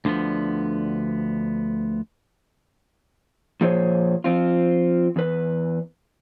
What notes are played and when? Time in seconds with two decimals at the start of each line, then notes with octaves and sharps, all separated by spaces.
0.05 D2 D3 E3 F3 B3
3.61 A#2 F3 G#4 C5 C#5
4.24 F3 C4 F4
5.16 E2 B4